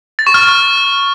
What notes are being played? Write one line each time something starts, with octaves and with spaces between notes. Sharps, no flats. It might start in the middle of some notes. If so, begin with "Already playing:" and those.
A6
C#6
F6